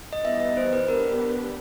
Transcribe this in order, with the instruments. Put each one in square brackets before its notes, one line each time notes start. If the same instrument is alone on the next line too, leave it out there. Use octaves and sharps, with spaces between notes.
[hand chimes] D#5
[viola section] E3 G3 B3 D#4 [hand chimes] E5
[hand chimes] D#5
C5
B4
[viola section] B3 D4 G4 B4 [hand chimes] A#4